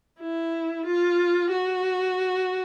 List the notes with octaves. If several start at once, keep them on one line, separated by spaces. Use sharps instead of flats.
E4
F4
F#4